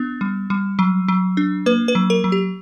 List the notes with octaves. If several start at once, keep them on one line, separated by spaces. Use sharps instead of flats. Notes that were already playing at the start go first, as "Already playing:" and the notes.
Already playing: B3 D4
G3
G3
F#3
F#3
D4
A#3 B4
B4
F#3
A#4
F#3
G4